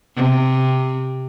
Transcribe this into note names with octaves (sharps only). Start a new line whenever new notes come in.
C3